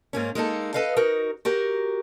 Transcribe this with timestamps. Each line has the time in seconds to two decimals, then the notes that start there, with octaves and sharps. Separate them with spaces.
0.13 G#2 A#3 C#4
0.35 G#3 A#3 D#4 A4
0.74 A4 B4 D#5 F5
0.96 D#4 F#4 A#4
1.45 F#4 G4 A#4